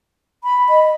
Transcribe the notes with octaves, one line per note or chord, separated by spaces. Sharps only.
B5
D#5